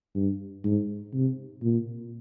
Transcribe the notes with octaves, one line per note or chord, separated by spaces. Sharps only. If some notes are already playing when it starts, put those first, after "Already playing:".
G2
G#2
C3
A#2